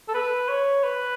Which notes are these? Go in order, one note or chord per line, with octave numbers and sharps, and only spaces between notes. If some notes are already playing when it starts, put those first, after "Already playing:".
A4
B4
C#5
B4